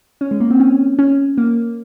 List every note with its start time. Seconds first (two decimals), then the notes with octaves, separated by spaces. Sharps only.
0.21 C#4
0.31 G#3
0.40 A#3
0.50 C4
0.60 C#4
0.99 C#4
1.38 A#3